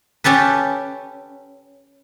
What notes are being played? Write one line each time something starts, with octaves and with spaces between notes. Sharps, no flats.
C#4 G4 A4 B4